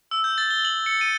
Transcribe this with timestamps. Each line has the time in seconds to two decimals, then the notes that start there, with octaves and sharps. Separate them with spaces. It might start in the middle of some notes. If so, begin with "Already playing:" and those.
0.11 E6
0.24 G6
0.38 A6
0.51 G7
0.65 F#7
0.86 C#7
1.01 D#7